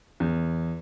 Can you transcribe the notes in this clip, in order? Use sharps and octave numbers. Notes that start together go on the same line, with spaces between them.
E2